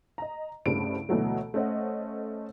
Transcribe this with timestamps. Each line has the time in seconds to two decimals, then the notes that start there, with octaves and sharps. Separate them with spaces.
0.18 D#5 A#5
0.66 C2 G2 C#3 A3 C5 D7
1.09 D2 B2 E3 F#3 A3
1.54 A3 C#4 C5 D#5 F#5